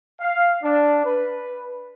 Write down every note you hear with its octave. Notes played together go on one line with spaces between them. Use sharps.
F5
D4
B4